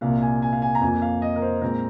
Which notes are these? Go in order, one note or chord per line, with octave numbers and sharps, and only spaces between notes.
C2 A#2 A#3 F5
G#5
G#5
F5
G#5
A#5
F2 F3 A#3 G#5
F5
D#5
A#4
C5
A#2 G#3 C4 A#4